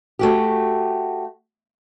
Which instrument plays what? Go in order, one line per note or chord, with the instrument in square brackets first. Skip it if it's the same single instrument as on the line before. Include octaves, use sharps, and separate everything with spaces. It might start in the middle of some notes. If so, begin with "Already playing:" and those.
[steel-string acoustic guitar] A3 F#4 G4